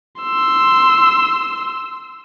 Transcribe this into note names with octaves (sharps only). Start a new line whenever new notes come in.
C6 E6